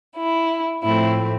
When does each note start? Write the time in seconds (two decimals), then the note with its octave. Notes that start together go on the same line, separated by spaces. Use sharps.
0.17 E4
0.83 A2 F3 A3 C4 E4